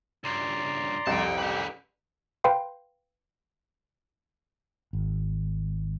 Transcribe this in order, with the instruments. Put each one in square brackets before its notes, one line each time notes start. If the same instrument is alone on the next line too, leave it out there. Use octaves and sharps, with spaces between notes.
[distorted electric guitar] C#2 G2 [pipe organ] D5 A#5 C6
[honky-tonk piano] C2 F2 [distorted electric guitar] G5 A5
[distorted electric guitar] C#4 B4 [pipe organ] G4
[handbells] B4 F5 G5 B5 C6
[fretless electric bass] G#1